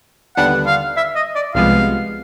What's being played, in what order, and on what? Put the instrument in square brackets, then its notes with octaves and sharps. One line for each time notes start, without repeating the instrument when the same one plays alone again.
[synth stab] D#2 D3 G3 B3 D4 [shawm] F#5
[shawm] F5
E5
D#5
D5
[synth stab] C2 C3 F3 G#3 B3 [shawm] F5